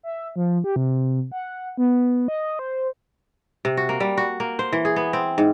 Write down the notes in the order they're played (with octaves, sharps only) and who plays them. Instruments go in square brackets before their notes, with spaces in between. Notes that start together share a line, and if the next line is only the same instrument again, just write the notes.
[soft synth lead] E5
F3
G4
C3
F#5
B3
D#5
C5
[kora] C3
F#4
A#3
G3
F#4
A#3
C5
E3
G#4
B3
C4
G#2